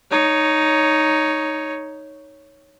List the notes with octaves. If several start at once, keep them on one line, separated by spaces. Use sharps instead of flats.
D#4 C#5